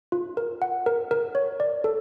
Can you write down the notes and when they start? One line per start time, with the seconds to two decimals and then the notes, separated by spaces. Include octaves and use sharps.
0.12 F4
0.37 A#4
0.62 F#5
0.86 A#4
1.11 A#4
1.35 C#5
1.60 D5
1.84 A4